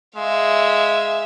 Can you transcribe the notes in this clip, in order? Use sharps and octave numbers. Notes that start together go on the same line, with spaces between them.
G#3 E5 F5